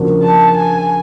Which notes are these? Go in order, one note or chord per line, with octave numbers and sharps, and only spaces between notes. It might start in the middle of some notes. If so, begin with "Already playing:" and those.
Already playing: C#3 F3 A#3 D4 F#4
A5
G#5